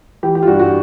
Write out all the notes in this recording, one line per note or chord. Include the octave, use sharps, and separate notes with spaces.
E3 G4
G4
F4
G2 F#4
F#4